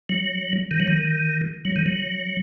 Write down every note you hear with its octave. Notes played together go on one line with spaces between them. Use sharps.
F#3
D#3
F#3
D#3
F#3
D#3
F#3